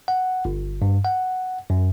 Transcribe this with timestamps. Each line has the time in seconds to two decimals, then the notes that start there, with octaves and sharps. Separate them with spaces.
0.08 F#5
0.45 G1
0.82 G2
1.05 F#5
1.70 F#2